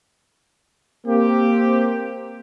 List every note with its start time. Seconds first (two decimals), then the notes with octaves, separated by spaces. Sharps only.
1.07 A#3 C4 G4